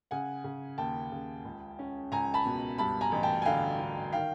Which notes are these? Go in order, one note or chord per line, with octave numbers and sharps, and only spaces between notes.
C#3 F#5 G#5
C#3
D#2 G5 A5
C#3
C#2
C#4
C#2 G#5 A#5
A5 B5
B2
G2 A5 B5
G#5 A#5
A1
G5 A5
G#5
D3 F5 G5
D3
D#3 F5 G5